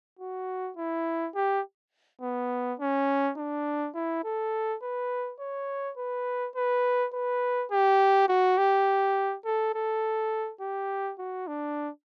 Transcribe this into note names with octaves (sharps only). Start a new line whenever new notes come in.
F#4
E4
G4
B3
C#4
D4
E4
A4
B4
C#5
B4
B4
B4
G4
F#4
G4
A4
A4
G4
F#4
D4